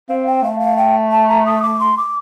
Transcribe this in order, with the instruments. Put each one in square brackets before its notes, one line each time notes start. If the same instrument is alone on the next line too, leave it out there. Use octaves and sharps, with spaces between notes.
[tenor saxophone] C4 [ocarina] F5
[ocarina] G5
[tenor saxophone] A3 [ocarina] F5
[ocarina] F5
G5
A5
A#5
D#6
D6
C6
D6